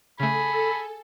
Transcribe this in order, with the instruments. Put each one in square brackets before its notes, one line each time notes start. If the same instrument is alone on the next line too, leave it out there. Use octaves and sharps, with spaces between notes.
[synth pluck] C#3 A3 [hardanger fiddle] G#4 [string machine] A4 [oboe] B5